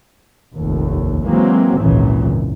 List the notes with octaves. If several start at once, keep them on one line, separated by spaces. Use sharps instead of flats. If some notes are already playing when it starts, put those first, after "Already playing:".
F1 A#1 D#2
E3 F#3 G#3 A#3 C4
G#1 C#2 F#2 A#2 C#3 E3